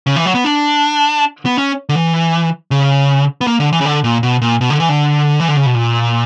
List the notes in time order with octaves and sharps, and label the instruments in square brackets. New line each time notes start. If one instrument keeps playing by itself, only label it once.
[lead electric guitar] C#3
E3
F#3
B3
D4
B3
C#4
D3
E3
C#3
B3
A#3
D3
E3
C#3
D3
A#2
B2
A#2
B2
D3
E3
D3
E3
D3
C#3
B2
A#2